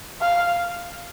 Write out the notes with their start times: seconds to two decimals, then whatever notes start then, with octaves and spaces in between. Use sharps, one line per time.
0.21 F5